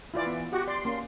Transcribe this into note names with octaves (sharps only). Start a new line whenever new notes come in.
E3 E4 F4 D5
B3
F#4 G4 F#5
D5 C6
A#3 C#4